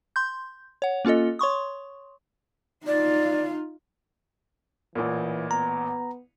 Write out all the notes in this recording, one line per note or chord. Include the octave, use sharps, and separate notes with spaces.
C6 G6
C#5 F#5
A#3 C#4 F4 A4 D#5
C#5 C6 C#6 D#6
D#4 F4 D5
A1 A#2 E3
B3 A#5